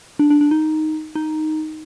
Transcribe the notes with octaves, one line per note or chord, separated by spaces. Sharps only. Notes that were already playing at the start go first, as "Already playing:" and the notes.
D4
D4
D4
D#4
D#4